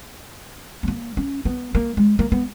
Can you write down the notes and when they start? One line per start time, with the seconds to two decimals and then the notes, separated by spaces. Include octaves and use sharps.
0.83 B3
0.88 A#3
1.17 C#4
1.45 B3
1.75 A#3
1.97 G#3
2.19 A#3
2.32 B3